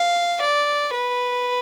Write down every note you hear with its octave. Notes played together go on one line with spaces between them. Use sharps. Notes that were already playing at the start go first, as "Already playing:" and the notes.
Already playing: F5
D5
B4